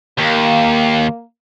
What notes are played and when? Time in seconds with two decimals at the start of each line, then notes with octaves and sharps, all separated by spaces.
0.19 D#2 A#3